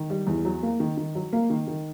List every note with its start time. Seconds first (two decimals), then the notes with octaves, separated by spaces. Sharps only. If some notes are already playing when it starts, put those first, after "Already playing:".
Already playing: D#3
0.10 G3
0.27 E2
0.45 F#3
0.63 A#3
0.80 D#3
0.97 D#3
1.15 F#3
1.33 A#3
1.50 D#3
1.68 D#3